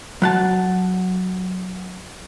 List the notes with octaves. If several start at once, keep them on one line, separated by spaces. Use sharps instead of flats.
F#3 F#5 A5